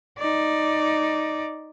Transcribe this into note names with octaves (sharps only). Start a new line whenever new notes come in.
D#4 D5